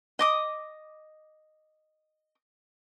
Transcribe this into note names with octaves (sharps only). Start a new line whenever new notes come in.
D#5 D6 D#6